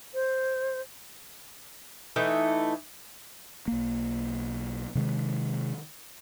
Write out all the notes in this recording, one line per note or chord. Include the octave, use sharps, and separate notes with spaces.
C5
E3 A3 D#4 E5
B1 A#3
C3 D#3 G#3